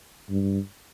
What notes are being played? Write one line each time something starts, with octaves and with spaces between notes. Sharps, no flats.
G2